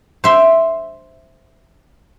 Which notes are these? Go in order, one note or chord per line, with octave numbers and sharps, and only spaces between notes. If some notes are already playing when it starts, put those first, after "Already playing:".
C5 E5 C6